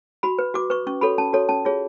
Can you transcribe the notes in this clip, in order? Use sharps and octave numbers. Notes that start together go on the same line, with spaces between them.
F#4 B5
B4
F#4 D6
B4 C#6
C#4 C#6
F#4 A4 C#5 B5
C#4 A5
F#4 A4 C#5
C#4 A5
F4 G#4 C#5